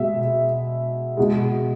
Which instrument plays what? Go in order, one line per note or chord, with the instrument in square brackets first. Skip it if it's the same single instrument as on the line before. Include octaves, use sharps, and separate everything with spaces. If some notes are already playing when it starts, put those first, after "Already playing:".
Already playing: [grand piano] B2 G#3 E5
B2 G#3